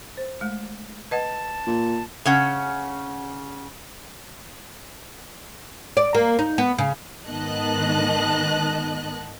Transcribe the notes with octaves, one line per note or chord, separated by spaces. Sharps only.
C5
G#3 A3
B4 D#5 F#5 A5
A#2
C#3 C#4 F#5
D5
A#3
D#4
B3
C#3
G#2 D#3 B3 D#5 A5 F#6